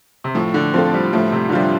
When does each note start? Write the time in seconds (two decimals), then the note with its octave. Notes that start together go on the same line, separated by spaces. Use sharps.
0.24 C3
0.35 A2 F3
0.54 D3
0.73 F3 C4 F4 A4
0.94 G3
1.13 A2 F3
1.32 C3
1.49 D3
1.52 F3 G3 D4 F4